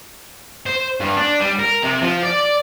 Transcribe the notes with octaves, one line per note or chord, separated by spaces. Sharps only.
C5
G2
D4
G3
A#4
C3
F3
D5